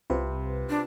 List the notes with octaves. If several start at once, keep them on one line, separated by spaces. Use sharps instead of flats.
C2 C3 F4 B4 C5
D4